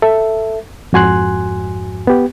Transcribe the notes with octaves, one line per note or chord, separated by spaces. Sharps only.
A4 E5
F2 G#2 F#4 G#5 C6 F#6
B3 G4